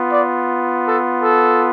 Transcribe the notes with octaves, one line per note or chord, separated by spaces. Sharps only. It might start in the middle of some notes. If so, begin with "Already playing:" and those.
Already playing: B3 F4
D5
A4
A4